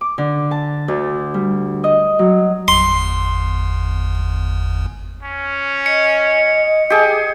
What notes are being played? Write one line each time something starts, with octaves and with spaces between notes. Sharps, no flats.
D6
D3
A5
D2
G3
D#5
F#3
G1 E2 C6
C#4
D#5 C#7
G4 G#4